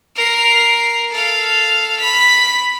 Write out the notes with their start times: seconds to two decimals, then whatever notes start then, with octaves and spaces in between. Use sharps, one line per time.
0.16 A#4 C7
1.11 A4 F5
2.00 B5 B6